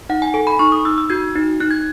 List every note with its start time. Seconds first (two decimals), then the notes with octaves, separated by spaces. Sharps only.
0.09 D#4 F#5
0.22 G#5
0.34 A4 G#5
0.47 B5
0.59 D#4 C#6
0.72 D#6
0.85 D#4 E6
0.98 E6
1.10 F#4 G#6
1.36 D#4
1.60 D#4 F#6
1.71 G#6